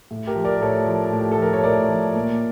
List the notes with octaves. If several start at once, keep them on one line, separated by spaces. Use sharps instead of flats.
A2
G4 A#4
F3
A#4 D5
A2 A4 C#5
F3
A2
G4
A4
F3 A#4
C#5
A2 A#4 D5
F3
A#2